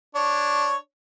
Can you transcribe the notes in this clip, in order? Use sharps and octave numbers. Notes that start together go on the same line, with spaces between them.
D4 C#5